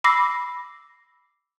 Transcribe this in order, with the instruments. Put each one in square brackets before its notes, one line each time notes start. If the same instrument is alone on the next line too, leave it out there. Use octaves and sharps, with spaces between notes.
[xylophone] B5 D6 E6 A#6 C7